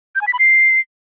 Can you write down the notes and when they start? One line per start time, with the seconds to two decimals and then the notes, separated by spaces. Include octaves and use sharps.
0.15 G6
0.21 G#5
0.27 B6
0.33 B5
0.39 C7